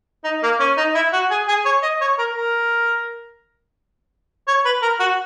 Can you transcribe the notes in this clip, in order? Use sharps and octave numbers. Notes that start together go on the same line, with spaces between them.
D#4
A#3
C#4
D#4
E4
F#4
G#4
G#4
C#5
D#5
C#5
A#4
A#4
C#5
B4
A#4
F#4